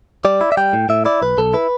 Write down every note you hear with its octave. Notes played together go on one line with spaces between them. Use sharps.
G3 D5
E4
E5
G3 G5
A2
A2 E5
E4 D5
B1 B4
B1 A4
E4 B4